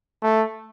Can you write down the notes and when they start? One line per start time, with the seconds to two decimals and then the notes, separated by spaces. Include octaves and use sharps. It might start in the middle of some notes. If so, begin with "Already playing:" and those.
0.23 A3